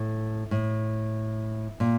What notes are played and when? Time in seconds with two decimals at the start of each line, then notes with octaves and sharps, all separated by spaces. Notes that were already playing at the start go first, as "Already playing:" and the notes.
Already playing: A2
0.51 A2
1.80 A#2